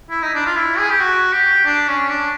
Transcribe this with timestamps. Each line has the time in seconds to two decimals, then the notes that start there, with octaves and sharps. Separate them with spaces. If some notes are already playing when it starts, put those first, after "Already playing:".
0.10 E4
0.22 D#4
0.35 D4
0.46 F4
0.56 E4
0.78 G#4
0.89 G4
1.00 F#4
1.33 G4
1.66 D4
1.88 C#4
2.09 D4